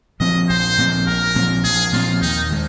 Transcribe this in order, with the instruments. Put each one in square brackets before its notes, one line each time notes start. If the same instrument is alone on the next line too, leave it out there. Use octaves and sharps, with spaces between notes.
[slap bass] A#2 F3 C4 [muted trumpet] D#5
[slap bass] A#1 [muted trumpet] C5
[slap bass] A#2 F3 C4
[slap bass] A#1 [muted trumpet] A#4
[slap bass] A#2 F3 C4
[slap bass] A#1 [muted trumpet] G#4
[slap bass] A#2 F3 C4 [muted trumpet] F4
[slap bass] D#2 [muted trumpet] D#4
[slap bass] D#3 G#3